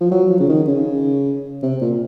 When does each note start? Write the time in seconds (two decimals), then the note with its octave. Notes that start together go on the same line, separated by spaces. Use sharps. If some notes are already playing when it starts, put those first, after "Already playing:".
0.01 F3
0.11 F#3
0.30 F3
0.40 C#3
0.49 D#3
0.68 C#3
1.63 C3
1.82 A#2